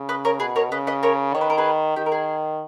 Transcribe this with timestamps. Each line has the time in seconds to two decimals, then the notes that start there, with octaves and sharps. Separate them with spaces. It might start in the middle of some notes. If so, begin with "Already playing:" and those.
Already playing: C#3
0.09 B4 D#5
0.25 A#4 C#5
0.40 B2 G#4 B4
0.56 A#4 C#5
0.72 C#3 B4 D#5
0.87 B4 D#5
1.03 A#4 C#5
1.34 D#3 C#5
1.41 B4
1.50 A#4
1.58 G#4 B4
1.96 D#3 G4
2.06 A#4
2.12 G#4